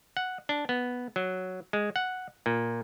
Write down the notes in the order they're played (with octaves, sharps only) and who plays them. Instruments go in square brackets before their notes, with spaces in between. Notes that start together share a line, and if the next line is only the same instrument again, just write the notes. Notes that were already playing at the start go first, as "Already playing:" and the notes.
[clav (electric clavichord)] F#5
D4
B3
F#3
G#3
F#5
A#2